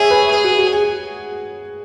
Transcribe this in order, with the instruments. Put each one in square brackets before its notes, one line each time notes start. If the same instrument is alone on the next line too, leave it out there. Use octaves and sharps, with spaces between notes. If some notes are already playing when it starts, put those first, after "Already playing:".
Already playing: [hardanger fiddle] G#4 [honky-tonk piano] C#5 E5 G#5
[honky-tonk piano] B4
[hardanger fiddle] G#4
[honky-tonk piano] F#4
F#4
G#4